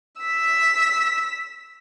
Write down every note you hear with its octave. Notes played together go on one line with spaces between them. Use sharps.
E6 B6